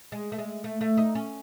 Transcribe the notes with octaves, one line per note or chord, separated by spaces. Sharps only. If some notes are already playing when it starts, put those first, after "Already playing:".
G#3
A3
G#3
A3
A3
D#4
C#4